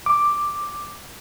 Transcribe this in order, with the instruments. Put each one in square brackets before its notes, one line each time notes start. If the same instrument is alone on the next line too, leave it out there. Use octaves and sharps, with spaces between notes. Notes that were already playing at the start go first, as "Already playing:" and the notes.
[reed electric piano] D6